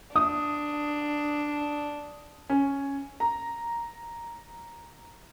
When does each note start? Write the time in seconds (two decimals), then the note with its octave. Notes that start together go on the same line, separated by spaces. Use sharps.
0.16 D4 D#6
2.50 C#4
3.20 A#5